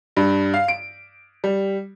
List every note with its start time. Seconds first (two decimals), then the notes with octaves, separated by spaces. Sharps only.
0.17 G2
0.54 F5
0.68 D7
1.44 G3